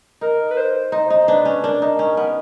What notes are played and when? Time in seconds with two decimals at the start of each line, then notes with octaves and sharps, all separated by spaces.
0.21 D#4 A#4
0.51 B4
0.57 C5
0.92 D#4 C5
1.10 D#4
1.28 D4 B4
1.45 C#4
1.63 D4 A#4
1.82 D#4
1.99 C#4
2.17 B3